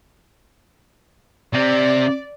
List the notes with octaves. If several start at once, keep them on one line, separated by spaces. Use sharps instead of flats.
C3 C4 D5